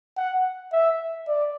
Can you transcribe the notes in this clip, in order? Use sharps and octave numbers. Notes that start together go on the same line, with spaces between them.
F#5
E5
D5